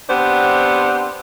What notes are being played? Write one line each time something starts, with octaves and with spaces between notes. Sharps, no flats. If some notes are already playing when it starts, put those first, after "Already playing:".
B3 C4 D4 G4 C5